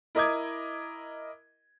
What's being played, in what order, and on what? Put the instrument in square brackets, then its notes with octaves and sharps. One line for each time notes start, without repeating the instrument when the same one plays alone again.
[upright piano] E4 A#4 D#5 D6 D#6 G#6